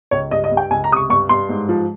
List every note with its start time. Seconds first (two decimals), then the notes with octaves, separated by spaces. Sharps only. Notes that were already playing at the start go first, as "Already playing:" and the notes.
0.11 C#2 C#5
0.31 G2 D#5
0.44 D#5
0.51 G2
0.57 G5
0.71 C#2 G#5
0.84 A#5
0.91 C3 D#6
0.96 C#6
1.10 G2 C#6
1.29 G2 C6
1.49 G#2
1.69 F3